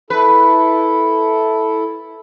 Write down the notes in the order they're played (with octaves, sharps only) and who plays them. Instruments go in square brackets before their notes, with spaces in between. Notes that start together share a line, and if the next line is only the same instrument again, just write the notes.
[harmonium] E4 A4 [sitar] B4